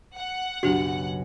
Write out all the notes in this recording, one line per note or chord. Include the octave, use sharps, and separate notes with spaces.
F#5
B1 F#2 C#3 D4 F#4 G4